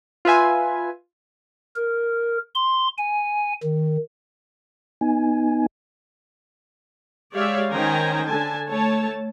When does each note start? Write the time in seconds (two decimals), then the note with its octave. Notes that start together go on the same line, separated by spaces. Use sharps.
0.25 F4 B4 E5 G#5
1.76 A#4
2.55 C6
2.98 G#5
3.63 D#3
5.01 B3 D#4 G#5
7.34 G#3 G4 C#5 D5 E5 F5
7.70 D#3 C#4 C5 G5 G#5 A#5
8.25 D3 G#5 A5
8.68 A3 C#5 A5